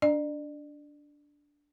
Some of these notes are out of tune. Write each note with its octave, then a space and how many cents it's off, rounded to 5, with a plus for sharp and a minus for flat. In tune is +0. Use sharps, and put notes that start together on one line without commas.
D4 -10 D5 +35